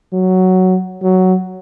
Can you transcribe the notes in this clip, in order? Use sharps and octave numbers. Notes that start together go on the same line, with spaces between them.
F#3
F#3